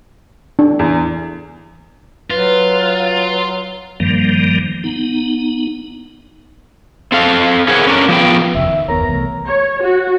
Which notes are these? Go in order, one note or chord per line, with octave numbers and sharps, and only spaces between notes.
D4
E2
F#3 F4 B4
G2 D#3 F3 G3 A#3
B3 D#4
C4 A4 F5
G#4 A#4 B4 C#5 F#5 G#5
C#4 D4 A#4
F3 B3 G5
F1 D#2 C#3 E5
D#3
F#1 D#2 B3 A#4 C#5 A#5
C2 E3 A3
C#5
F#4